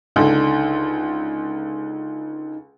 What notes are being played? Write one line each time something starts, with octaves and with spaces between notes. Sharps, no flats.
C#2 D3 D#4